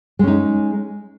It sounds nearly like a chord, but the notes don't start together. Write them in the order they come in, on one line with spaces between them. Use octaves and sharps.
G#3 C#4 D#4